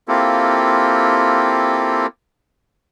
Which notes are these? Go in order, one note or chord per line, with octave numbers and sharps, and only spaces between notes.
A#3 C4 E4 F4 G4 A4